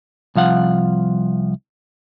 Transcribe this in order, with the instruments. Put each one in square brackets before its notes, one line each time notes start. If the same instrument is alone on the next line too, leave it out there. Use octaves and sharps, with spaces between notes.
[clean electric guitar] C2 F3 F5 F#5